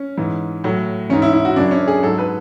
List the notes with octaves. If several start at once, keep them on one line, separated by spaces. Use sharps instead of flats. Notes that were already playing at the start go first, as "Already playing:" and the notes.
Already playing: C#4
G#2 E3
A2 F#3
G#2 E3 C#4
E4
E4
F#4
F#2 C#3 F#3 D4
C#4
G#4
G#2 F#3 A4
B4